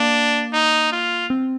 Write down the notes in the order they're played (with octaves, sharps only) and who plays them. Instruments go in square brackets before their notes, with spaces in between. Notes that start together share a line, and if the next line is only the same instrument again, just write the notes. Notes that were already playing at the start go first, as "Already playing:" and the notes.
Already playing: [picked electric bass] A#3 [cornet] D4
[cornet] D#4
F4
[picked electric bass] C4